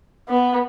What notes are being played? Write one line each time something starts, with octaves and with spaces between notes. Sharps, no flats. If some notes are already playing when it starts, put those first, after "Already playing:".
B3